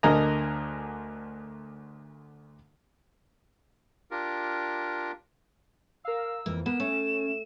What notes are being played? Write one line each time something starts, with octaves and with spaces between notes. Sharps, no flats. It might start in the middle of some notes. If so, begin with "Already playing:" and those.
D2 D3 A#4 D#5 G#5 A#5
D4 F4 G4 A#4
A#4 F5 E6
F2 E3 A#3
A#3 B3 E7
A3 C#4